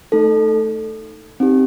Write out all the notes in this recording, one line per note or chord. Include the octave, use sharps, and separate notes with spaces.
A3 D#4 A4
C4 D#4 G4